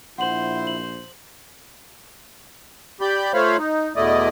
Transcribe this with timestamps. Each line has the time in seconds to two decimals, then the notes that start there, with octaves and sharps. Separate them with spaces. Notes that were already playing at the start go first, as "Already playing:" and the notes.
0.18 A#1 E4 C5 F#5 F#7
0.67 F#7
3.01 G4 D5 B5 G6
3.34 A3 F4 C5 C#5 F5 B5
3.58 D#4
3.96 E2 B2 A3 E4 D5 D#5